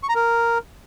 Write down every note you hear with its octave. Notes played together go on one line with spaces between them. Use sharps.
C#6
A#5
A#4